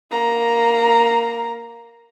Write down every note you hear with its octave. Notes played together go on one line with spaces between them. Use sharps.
A#3 A#5